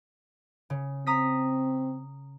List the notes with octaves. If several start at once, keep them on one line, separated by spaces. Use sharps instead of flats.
C#3
C4 A#5 D#6 B6